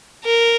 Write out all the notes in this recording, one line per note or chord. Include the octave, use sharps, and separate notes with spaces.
A#4